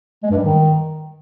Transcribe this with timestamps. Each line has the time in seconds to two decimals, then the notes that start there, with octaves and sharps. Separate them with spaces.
0.23 G#3
0.30 G2
0.37 G3
0.44 D#3